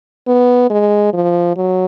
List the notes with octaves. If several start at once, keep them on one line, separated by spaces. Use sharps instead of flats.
B3
G#3
F3
F#3